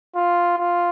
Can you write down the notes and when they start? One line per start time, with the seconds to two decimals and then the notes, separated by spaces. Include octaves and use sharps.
0.16 F4
0.58 F4